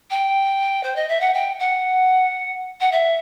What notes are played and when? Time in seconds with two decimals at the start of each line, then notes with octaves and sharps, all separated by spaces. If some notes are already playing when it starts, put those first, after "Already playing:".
0.10 G5
0.83 C5
0.96 D#5
1.08 E5
1.20 F#5
1.34 G5
1.59 F#5
2.80 F#5
2.92 E5